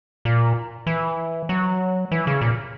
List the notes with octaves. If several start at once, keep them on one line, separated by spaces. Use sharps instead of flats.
A#2
E3
F#3
E3
C#3
A#2